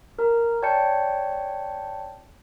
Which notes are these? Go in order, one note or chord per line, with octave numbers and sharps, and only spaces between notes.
A#4 A#5
C#5 D5 G5 A5 G6 C#7